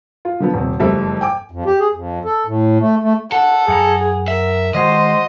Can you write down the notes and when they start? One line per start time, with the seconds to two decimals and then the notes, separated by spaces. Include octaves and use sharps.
0.25 F4
0.40 D3 F3 B3
0.54 D#1 C3
0.79 F#1 F2 G3 A3 C5 E5
1.21 G5 G#5 D6
1.51 F2
1.66 G4
1.80 G#4
1.94 F2
2.25 A4
2.46 A2
2.80 A3
3.02 A3
3.32 A4 F#5
3.68 F#2 G#4 F#5 A#5
4.28 A#4 E5
4.74 D#3 G#3 F#4 C5 D#5